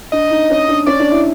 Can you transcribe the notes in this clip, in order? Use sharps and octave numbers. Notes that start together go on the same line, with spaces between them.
D4 D#5
D#4
C#4
D4
C#4 D5
D4
E4